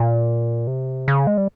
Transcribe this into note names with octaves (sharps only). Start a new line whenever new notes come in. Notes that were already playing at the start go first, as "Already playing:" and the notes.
Already playing: A#2
C3
C#3
G#3
G3